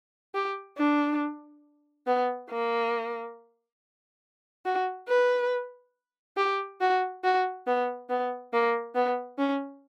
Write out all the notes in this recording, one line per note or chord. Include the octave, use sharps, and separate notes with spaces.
G4
D4
B3
A#3
F#4
B4
G4
F#4
F#4
B3
B3
A#3
B3
C#4